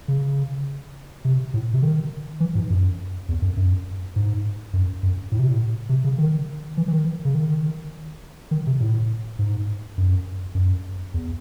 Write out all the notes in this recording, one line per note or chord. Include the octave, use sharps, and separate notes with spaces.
C#3
C3
A2
C3
D#3
E3
G#2
F#2
E2
F#2
F#2
G#2
F#2
F#2
A2
C3
A2
C3
C#3
D#3
E3
E3
D#3
C#3
D#3
D#3
C3
A2
G#2
F#2
F#2
E2